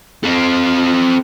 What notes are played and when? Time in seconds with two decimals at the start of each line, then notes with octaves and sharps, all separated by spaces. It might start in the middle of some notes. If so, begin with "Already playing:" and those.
0.24 C4 A4